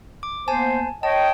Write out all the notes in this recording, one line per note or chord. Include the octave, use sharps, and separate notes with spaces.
D6
A#3 B3 C5 G#5 A5
C#5 D#5 G5 A5